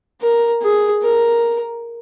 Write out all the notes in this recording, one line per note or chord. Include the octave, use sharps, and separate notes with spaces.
A#4
G#4
A#4